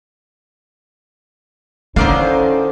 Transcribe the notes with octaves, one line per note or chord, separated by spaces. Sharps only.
D3 D#3 C#4 E4 C5 D5 F5